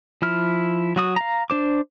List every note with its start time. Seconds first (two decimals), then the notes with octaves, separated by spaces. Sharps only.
0.22 F3 E4 F6
0.96 F#3 F#4 D#6
1.16 F5 A#5
1.50 D4 C5 D6